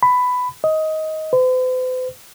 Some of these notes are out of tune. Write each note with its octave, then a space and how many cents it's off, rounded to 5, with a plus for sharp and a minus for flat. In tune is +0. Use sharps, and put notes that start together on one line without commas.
B5 +10
D#5 +15
C5 -45